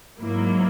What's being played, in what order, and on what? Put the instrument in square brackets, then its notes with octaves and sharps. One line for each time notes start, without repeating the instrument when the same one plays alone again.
[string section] G#2 F#3 A#3 E4